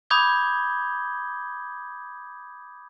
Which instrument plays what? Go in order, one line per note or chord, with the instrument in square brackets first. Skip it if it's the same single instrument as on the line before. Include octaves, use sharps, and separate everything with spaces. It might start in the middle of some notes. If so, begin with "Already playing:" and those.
[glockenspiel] B5 D6 D#6 G6 G#6 G7